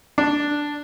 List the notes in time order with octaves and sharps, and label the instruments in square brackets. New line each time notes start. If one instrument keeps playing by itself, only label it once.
[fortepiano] D4